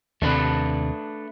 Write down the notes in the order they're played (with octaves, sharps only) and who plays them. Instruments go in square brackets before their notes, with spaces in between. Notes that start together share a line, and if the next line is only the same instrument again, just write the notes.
[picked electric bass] D#2 C3 [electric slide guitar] A3 D4 B4